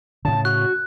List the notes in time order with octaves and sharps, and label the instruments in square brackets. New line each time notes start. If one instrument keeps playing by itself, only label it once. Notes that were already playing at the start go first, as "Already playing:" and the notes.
[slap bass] A2 C#3 [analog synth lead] A5
[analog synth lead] F#4 [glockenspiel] F#6